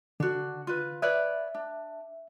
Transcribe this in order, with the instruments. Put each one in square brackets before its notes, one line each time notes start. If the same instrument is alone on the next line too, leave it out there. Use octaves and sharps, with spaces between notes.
[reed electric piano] D3 [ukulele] D4 F#4
[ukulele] F4 B4
[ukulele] B4 C#5 D5 [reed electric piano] E5
[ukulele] D4